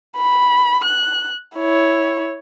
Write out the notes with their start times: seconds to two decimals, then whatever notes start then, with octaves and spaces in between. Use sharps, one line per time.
0.17 B5
0.84 F#6
1.56 E4 C#5